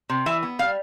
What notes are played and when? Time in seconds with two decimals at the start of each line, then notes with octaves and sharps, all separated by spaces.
0.10 C3
0.26 E3 E5
0.43 B3
0.59 G3 F5